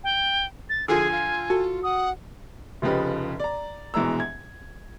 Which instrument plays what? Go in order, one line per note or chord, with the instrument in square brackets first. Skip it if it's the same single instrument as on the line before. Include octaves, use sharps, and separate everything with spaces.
[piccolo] G5
A6
[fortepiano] D3 F3 [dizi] G#4 [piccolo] G#5
[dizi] F4
[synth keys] F#4 [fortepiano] A4
[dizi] F#5 [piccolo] D#6
[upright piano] F1 C#3 F3 G4 B4 D#5
D5 A#5
A#1 B2 E3 G#3 A#5 E6
G#6